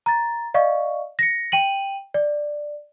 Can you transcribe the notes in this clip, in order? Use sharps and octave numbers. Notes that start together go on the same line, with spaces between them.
A#5 A6
D5 D#5 F5 C#6
A#6 C#7
G5 D#7 F#7
D5